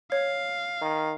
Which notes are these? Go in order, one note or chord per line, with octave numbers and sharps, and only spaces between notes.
C#5 F5
D#3